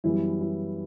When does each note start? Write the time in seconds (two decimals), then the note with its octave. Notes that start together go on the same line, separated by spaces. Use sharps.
0.04 F#2 E3 G3 B3 E4
0.41 E4